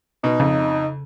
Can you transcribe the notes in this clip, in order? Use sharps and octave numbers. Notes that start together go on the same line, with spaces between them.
B2 D#4
F2 C#3